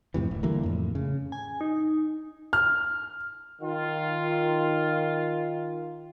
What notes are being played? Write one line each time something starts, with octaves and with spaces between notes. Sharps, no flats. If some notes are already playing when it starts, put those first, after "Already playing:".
F2 A2 C3 E3
D1
D3 E3 G3 A#3
F2 A2
C#3
G#5
D#4
F6
D#3 F4